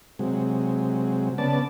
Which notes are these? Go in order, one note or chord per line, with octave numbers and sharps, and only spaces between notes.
C3 F#3 G#3
C#3 B3 D5 A5